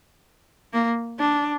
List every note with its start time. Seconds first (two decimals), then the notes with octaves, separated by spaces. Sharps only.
0.73 A#3
1.19 D4